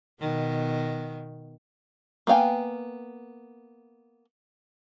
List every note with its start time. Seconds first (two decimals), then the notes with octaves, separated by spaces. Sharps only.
0.20 B2 D#3 B3
2.27 A#3 B3 F5 G5 G#5